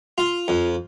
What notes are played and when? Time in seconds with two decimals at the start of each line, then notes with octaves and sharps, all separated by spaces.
0.18 F4
0.48 F2